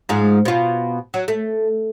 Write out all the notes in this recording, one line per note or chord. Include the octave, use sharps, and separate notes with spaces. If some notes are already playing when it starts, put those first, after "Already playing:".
G#2 F3 G#3
B2 F4
F#3
A3